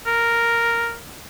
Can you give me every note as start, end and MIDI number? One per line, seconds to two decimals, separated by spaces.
0.06 0.96 70